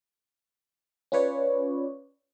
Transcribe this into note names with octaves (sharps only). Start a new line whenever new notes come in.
C#4 F4 B4 C#5 D5